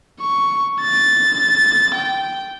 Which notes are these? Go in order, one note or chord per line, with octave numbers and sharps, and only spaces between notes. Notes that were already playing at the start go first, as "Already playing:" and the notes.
C#6
A6
G5